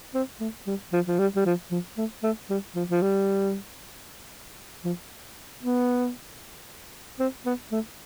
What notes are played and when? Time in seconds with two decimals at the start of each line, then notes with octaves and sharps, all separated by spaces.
0.15 C4
0.40 A3
0.67 G3
0.92 F3
1.08 F3
1.19 G3
1.36 G3
1.46 F3
1.71 F3
1.98 A3
2.23 A3
2.50 G3
2.76 F3
2.90 F3
3.02 G3
4.85 F3
5.63 B3
7.19 C4
7.46 B3
7.72 A3